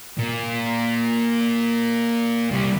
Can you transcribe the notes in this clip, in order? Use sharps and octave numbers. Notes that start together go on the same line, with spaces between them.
A#2
C2 G3